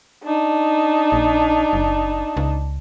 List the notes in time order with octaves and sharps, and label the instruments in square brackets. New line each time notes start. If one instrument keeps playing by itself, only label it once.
[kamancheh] D4 D#4
[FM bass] A#1
F#1
C#2